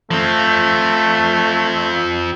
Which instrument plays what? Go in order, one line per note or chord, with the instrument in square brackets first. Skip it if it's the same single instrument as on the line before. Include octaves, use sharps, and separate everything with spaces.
[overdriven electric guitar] F3 C4 [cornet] A3